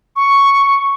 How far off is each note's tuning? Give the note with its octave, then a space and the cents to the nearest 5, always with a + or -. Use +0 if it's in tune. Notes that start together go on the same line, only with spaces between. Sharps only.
C#6 +0